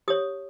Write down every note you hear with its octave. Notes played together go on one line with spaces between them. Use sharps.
G4 C#5 D#6